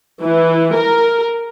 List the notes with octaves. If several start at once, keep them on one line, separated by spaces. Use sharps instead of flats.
E3
A#4